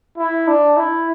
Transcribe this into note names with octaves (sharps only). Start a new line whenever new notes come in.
E4
D4
E4